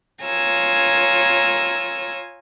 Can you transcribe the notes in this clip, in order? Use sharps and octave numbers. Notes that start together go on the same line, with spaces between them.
F4 C#5 G#5 A#5 E6